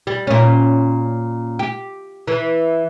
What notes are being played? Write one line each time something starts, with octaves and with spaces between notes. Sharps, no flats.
G3
A#2 C#4
G4
E3